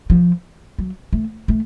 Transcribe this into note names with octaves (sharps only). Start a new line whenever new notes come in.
F3
F#3
A3
A3